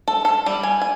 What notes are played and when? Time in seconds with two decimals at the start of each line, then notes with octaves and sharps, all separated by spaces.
0.08 A4
0.25 A4
0.46 G3
0.63 G#5
0.82 G#5